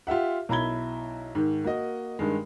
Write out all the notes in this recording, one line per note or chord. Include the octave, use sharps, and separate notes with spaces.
F4 G4 E5 F#5
B1 E4 A#5 B5 G#6 G7
G#2 D#3
A#3 F#4 D#5
G2 D#3 G#3